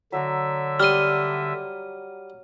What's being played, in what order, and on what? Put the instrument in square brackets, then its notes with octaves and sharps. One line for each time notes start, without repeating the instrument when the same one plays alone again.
[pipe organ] D3 E5 [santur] F#3 F5 A#5
[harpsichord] G3 C6 [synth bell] F6 D#7